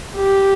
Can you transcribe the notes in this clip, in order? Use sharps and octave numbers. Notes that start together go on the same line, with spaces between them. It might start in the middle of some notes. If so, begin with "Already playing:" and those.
G4